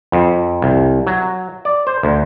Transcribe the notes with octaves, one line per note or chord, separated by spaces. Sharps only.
F2
C2
F#3
D5
C5
D2